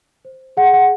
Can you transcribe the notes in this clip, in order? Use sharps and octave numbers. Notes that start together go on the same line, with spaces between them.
C5
G#4 F#5
F#5